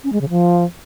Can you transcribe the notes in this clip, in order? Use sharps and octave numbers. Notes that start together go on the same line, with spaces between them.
C#4
G#3
C#3
F3